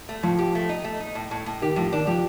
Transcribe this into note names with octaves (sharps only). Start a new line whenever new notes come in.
A3
A2 F3
G4
A3
D#4
A3
D#4
A2
A2
A2
D#3 G4
A2 F3
D#3 D4
F3 G4